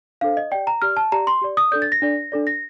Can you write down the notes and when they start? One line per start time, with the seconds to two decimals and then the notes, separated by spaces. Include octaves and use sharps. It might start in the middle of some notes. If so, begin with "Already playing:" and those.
0.21 D4 A4 C5 F5
0.37 D#5
0.51 G4 D5 G5
0.67 A#5
0.82 G4 D5 F6
0.97 A5
1.12 G4 D5 A#5
1.27 C6
1.42 G4 D5
1.57 D#6
1.72 D4 A4 D5 G6
1.82 A6
1.92 A#6
2.02 D4 A4 D5
2.32 D4 A4 D5
2.47 A#6